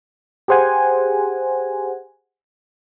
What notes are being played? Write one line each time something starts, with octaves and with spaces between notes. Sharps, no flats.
G4 G#4 C5 F#5 G#5